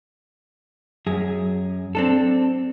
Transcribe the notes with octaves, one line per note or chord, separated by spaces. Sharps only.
F#2 G#4
C4 D4 A4